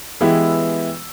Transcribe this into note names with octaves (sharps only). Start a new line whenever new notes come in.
E3 G#3 B3 E4 G4